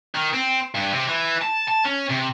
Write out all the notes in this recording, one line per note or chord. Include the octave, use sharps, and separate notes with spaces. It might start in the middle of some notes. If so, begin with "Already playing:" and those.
D#3
C4
G2
C3
E3
A5
A5
C#4
C3